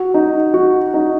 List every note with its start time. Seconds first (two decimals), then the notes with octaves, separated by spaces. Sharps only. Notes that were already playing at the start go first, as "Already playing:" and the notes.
Already playing: F#4
0.14 D#4
0.54 F#4
0.94 D#4